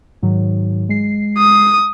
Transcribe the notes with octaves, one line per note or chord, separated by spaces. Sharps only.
G#2 D#3 F#3
G#3 C7
D#6